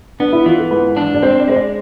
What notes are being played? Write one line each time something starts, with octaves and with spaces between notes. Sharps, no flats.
B3 D4
E4
E3 F4
A4
G#2 B4
D4
D5
C4 C5
D5
G#3 C5
D5